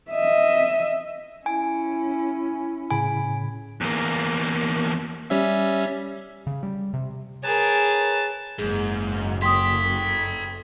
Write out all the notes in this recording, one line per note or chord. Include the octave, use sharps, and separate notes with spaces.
D#5 E5
C#4 E4 G#5
A2 C#3 G#5 B5
E2 A#3
G3 C#4 E5
C#3
G3
C3
G#4 A#4 B4 C#5 A5
F#1 G#2 G#4
A4 G5 C6 D#6 B6